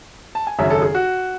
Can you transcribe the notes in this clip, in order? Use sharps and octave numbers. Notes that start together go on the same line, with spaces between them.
A5
G#5
G#1 F#2 C#3 F#3 E5
A4
G#4
F#4